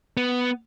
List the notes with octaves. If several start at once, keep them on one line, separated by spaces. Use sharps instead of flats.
B3